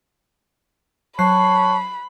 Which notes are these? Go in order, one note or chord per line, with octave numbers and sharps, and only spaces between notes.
F#3 C#5 A5 B5 F#6 C7